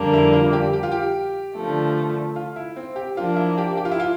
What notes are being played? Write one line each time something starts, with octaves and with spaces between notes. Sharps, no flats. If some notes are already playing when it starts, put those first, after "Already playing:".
Already playing: F2 D3 G3 A#3 D4
E4
F4
G4
G4
F4
G4
D3 F3 A3
F4
E4
C4
G4
F3 A#3 D4 F4
E4
G4
G4
F4
E4
F4